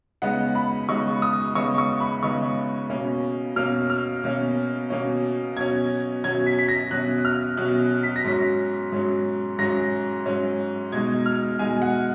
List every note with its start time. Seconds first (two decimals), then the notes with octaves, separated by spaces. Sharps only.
0.22 C#3 G#3 B3 D#4 F#5
0.55 B5
0.89 C#3 G#3 B3 D#4 C#6
1.22 D#6
1.55 C#3 G#3 B3 D#4 C#6
1.78 C#6
2.00 B5
2.22 C#3 G#3 B3 D#4 C#6
2.90 B2 A#3 C#4
3.56 B2 A#3 C#4 F6
3.90 F6
4.24 B2 A#3 C#4
4.90 B2 A#3 C#4
5.57 B2 F#3 C#4 G#6
6.24 B2 F#3 C#4 G#6
6.46 B6
6.59 B6
6.69 A#6
6.91 B2 F#3 C#4 F#6
7.25 F6
7.57 B2 F#3 C#4 F#6
8.03 B6
8.16 A#6
8.24 G#2 F#3 C#4 B6
8.92 G#2 F#3 C#4
9.59 G#2 F#3 C#4 A#6
10.26 G#2 F#3 C#4
10.92 B2 G#3 D#4 G#6
11.26 F6
11.59 B2 G#3 D#4 G#5
11.82 F#5